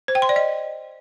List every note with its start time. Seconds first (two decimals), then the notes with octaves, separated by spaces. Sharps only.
0.08 C5
0.15 G5
0.22 C6
0.29 D5
0.36 D#5